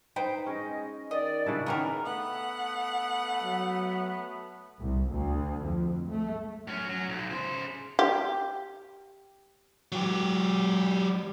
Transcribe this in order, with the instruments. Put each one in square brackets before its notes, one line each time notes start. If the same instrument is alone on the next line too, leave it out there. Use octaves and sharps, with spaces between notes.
[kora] D#4 [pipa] B4 C5 G5
[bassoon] G#3 [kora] C#4 [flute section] D#5
[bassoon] D#3 [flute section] D5 [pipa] D#5
[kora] C#3 D4 E4
[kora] D#3 A#3 [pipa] B3 C#4 A#4 [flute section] B5
[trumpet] A3 [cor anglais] B3 [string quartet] F#5
[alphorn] F#3
[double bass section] C2
D2
F2
A3
[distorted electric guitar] F#2 C#4
F#3
B1
C#3 C5
[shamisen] G4
[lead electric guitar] F#3 G4